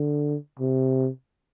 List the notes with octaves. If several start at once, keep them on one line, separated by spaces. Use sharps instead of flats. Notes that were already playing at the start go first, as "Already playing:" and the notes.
Already playing: D3
C3